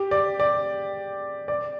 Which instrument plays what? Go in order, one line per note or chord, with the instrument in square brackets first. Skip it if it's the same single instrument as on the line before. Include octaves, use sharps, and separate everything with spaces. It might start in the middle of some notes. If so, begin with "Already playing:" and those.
Already playing: [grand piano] G4
D5
D5
D5